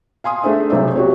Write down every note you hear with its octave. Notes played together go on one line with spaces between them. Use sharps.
F5 G#5 C6 D#6
A3 D4 G#4 C5 E5
B1 C3 A3 C5 D5 E5
F#4 G4 C#5